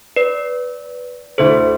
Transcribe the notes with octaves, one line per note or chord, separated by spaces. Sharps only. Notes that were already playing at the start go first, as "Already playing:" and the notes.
B4 D5
D2 D3 A3 E4 A4 C5